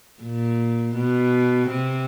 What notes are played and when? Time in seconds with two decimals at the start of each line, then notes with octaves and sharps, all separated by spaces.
0.23 A#2
0.95 B2
1.69 C3